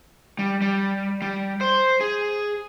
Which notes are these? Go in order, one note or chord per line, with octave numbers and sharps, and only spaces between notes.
G3
G3
G3
C5
G#4